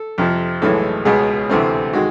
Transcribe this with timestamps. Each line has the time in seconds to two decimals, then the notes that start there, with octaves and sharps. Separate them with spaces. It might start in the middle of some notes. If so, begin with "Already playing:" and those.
Already playing: A4
0.18 F2 C3 F3
0.62 B1 A2 E3 G#3 A4
1.05 C#2 B2 G#3 B3 G#4
1.49 D2 C3 E3 A3 C4
1.93 D#3 G#3 F#4